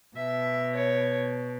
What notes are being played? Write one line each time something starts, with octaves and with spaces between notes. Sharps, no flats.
B2 E5
C#5